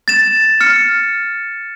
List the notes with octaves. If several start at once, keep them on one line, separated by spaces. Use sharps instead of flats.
A6 E7
F6 C#7